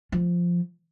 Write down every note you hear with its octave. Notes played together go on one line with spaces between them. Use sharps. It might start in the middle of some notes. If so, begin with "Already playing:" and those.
F3